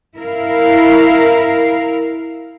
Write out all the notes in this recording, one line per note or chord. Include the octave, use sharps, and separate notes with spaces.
E4 A#4 F5